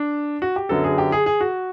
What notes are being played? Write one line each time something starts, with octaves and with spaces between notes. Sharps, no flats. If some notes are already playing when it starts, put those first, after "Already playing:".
Already playing: D4
F#4
G4
F#2 D3 F#3 B3 A4
G#4
G4
G#4
G#4
F#4